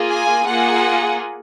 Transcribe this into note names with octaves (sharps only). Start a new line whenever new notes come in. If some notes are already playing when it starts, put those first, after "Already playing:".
Already playing: A#3 F4 G#4
G#5
A#3 F4 G#4 F#5